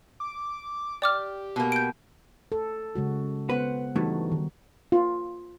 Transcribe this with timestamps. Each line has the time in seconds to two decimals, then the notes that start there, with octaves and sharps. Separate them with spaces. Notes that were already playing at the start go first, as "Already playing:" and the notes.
0.20 D6
1.02 G4 D5 D6 F6
1.56 B2 A#3
1.72 G6 D7
2.52 A4
2.95 C#3 G#3 F#4
3.50 B3 B4 C5 F#5
3.96 G2 E3 G3 A3 D#4 F#4
4.32 D#3
4.92 F4